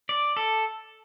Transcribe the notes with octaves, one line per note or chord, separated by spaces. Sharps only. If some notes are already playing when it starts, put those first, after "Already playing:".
D5
A4